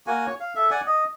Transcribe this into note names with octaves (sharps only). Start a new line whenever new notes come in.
A#3 F#4 G#5
C#5
F5
A4 E5
D5 F#5 G#5
D#5